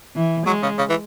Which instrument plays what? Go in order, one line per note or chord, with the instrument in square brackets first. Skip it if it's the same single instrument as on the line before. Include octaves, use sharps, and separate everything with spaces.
[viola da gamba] E3
[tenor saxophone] F#3 [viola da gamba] G#3
[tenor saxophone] C#3
C#3
E3